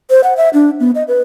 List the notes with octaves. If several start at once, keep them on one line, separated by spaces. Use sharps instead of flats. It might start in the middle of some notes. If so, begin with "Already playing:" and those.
C5
F#5
E5
D4
B3
D#5
B4